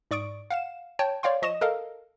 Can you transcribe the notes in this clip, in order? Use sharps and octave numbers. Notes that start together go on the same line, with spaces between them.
G#2 D5 C#6 D#6 D7
F5 F#5 E7
C#5 G5 A5
C#5 D5 F5 G5 C6
F3 D#5 C#6 D#6 E7
A4 A#4 D#5 F5